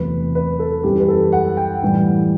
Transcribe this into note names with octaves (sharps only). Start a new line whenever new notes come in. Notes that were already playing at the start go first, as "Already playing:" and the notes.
Already playing: E2 C3 F#3 A3 B4
B4
A4
F#2 E3 G3 G4
B4
A4
F#5
G5
A2 E3 G3